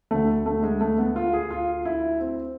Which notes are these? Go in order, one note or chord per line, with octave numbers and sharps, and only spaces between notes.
D2 D3 A3
A3
G#3
A3
B3
F4
G#4
F4
E4
C4